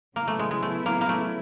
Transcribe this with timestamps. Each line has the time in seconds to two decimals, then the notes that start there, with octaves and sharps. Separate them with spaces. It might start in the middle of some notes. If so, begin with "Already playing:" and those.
0.16 C#3 F#3 A#3 B3 E4
0.28 A3
0.39 G#3
0.51 G#3
0.63 A3
0.86 A#3
1.01 A#3
1.09 A3